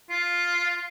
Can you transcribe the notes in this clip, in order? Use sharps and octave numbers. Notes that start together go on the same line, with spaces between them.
F4